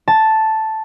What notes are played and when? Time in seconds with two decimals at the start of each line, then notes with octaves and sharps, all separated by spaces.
0.08 A5